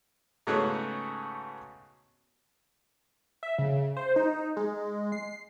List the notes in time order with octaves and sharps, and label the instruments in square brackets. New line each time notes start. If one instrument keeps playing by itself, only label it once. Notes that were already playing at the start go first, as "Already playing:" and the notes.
[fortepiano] G#2 C#3 A3 B3 C#4 F#4
[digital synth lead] E5
C#3
C5
D#4
G#3
C7